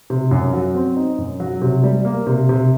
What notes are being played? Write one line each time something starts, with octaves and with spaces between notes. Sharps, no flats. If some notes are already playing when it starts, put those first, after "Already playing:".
C3
F#2
F#3
C4
D#4
F#2
F#3
C3
G3
A#3
C3
C3